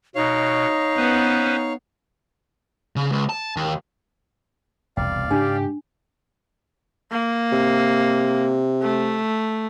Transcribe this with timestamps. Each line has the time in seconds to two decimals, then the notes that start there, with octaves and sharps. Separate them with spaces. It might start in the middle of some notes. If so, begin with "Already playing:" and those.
0.15 B2 D#4 C#5 F5
0.97 B3 C#4 B4 C5
2.96 C#3
3.12 C#2
3.29 A5
3.57 D#2
4.97 E1 C2 F2 D5 F5 G5
5.31 G#2 C#3 G#3 D4 G4 G#5
7.11 A#3
7.52 C3
8.82 A3